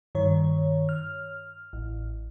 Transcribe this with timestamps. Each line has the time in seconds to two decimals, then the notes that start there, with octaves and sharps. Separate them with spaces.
0.15 G2 D#3 C#5
0.89 F6
1.73 A1